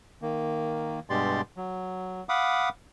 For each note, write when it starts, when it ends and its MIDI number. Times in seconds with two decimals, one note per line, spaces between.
0.22 1.00 51
0.22 1.00 58
1.10 1.41 43
1.10 1.41 47
1.10 1.41 56
1.10 1.41 67
1.10 1.41 74
1.10 1.41 84
1.57 2.24 54
2.29 2.69 77
2.29 2.69 78
2.29 2.69 83
2.29 2.69 86
2.29 2.69 87